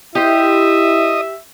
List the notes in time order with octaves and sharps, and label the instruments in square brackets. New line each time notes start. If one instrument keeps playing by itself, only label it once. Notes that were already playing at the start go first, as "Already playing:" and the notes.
[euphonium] E4 [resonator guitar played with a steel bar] G4 C5 [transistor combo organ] D#5 [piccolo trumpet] E5